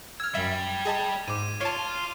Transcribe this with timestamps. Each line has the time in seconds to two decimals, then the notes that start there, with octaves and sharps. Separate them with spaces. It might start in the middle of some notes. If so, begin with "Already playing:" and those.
0.20 E6 F6 G#6
0.35 F#2 G3 E5
0.85 G#4 D#5 A5
1.28 G#2 D6 D#7
1.61 F4 C#5 A5 D7